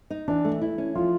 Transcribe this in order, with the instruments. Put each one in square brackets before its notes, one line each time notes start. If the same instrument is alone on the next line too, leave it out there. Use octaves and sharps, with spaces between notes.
[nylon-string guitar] D#4
[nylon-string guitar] E3 [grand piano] D4
[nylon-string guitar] A3
E4
C#4
[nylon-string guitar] F3 [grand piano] F4